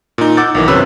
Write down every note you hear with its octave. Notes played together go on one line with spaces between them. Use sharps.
A#2 D#4
F#5 D6 E6 G6 A6
B1 D#3 E3
F#2 C3 C#4 B4 B5 E6